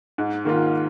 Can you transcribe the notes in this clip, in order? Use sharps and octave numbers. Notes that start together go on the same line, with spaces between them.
G#2
D#3 A#3 F4